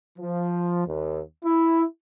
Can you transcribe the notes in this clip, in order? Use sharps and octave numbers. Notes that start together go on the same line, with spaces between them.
F3
D#2
E4